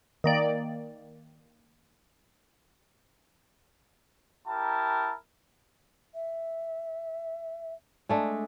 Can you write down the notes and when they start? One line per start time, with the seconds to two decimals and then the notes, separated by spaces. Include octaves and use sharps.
0.24 D#3 A#3 D5
4.48 E4 G4 A#4 A5 A#5
6.14 E5
8.09 G#3 A3 D4